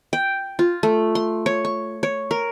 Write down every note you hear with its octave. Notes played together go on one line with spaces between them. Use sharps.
G5
F4
A3
C6
C#5
C#6
C#5
A#4